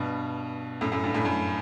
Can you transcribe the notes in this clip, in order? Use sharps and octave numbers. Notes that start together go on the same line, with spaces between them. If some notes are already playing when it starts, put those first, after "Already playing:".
Already playing: G2 B2
F#2 A2
F#2 A2
G2
F#2 A2
F#2 A2